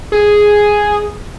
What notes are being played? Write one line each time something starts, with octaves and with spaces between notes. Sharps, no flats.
G#4